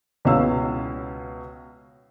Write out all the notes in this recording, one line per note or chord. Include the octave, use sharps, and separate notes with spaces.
C#2 B2 C#4 E4 F5 E6